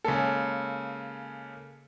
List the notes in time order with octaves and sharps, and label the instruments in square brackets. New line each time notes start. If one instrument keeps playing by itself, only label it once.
[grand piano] C#3 G#3 A#3 A4